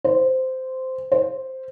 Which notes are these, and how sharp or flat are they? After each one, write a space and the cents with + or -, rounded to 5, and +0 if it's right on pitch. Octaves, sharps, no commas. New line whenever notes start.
C5 -10
C5 +0